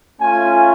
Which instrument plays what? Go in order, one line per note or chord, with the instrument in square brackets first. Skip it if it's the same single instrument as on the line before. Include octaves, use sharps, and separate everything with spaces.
[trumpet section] A3 C#4 F4 G#5